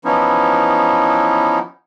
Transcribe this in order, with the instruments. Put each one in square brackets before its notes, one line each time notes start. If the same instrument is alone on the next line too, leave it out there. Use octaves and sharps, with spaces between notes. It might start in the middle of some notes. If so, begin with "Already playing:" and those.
[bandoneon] E3 F3 B3 C#4 D#4 E4